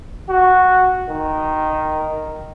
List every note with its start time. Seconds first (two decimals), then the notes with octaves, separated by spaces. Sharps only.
0.29 F#4
1.09 D#3